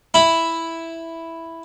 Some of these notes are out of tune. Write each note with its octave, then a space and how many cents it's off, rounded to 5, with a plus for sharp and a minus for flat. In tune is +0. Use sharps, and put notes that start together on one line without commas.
E4 +0 B5 +0